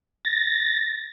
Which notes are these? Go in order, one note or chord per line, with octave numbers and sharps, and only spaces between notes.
A6 A#6